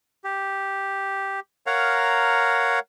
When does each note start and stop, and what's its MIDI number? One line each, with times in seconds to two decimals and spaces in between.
0.24 1.40 67
1.66 2.79 70
1.66 2.79 73
1.66 2.79 77
1.66 2.79 78
1.66 2.79 82